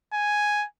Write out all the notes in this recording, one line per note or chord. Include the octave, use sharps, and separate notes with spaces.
G#5